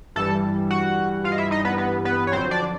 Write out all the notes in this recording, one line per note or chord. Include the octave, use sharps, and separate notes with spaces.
G2 E3 G3 A4 A5
F#4 F#5
F4 F5
D#5
E4 E5
D#4 D#5
B3 B4
B3 B4
B3 B4
C#5
F2 D3 F#3 C4 C5
D4 D5